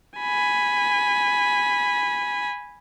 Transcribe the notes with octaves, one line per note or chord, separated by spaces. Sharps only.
G#5 B5